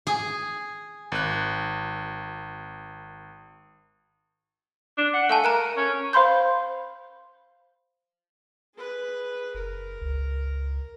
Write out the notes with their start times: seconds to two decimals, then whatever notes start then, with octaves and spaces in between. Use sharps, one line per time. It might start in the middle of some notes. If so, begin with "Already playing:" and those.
0.07 G#4
1.12 G#1 F#6
4.97 D4
5.14 F#5
5.30 A3 F5 G#5 A5
5.44 A#4 A#5 F#6 D#7
5.77 C#4
6.13 C5 F5 B5 C6 G6
8.74 G#4 B4
9.55 F#1 A#4
10.01 C#2